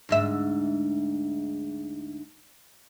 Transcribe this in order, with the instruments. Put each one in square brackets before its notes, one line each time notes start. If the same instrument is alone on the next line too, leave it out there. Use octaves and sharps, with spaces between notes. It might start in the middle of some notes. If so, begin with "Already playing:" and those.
[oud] D2 G#2 E5